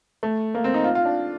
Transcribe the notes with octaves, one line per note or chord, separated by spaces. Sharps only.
A3
A#3
C4
D#4
F4
F4
D4